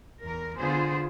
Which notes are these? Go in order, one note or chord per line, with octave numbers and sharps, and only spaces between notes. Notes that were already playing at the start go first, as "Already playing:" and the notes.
E2 A#4
D3 B3 F4 G#4 C5